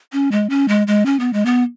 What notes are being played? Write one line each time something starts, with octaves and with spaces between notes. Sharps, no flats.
C#4
G#3
C#4
G#3
G#3
C#4
B3
G#3
B3